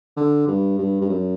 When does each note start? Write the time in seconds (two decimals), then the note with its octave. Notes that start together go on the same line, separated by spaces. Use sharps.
0.17 D3
0.48 G2
0.78 G2
1.01 G2
1.09 F#2